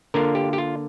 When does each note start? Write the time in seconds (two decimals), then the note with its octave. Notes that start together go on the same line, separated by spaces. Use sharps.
0.14 D3 A#3 D4 F4 A#4
0.35 G4
0.53 G4
0.58 F4